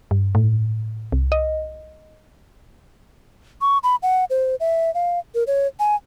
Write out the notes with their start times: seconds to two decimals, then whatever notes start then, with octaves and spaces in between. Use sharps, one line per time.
0.11 G2
0.35 A2
1.12 C2
1.32 D#5
3.61 C#6
3.83 B5
4.03 F#5
4.30 C5
4.60 E5
4.94 F5
5.35 A#4
5.47 C#5
5.80 G#5